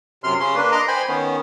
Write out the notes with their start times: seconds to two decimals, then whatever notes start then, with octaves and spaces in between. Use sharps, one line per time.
0.24 F#2 C3 C6 F6
0.40 C#3 C#4 C6
0.55 A#3 D4 B4
0.71 D#5 A#5 C6 D6
0.88 C5 G5 G#5 B5 C6
1.08 D#3 B3 C#4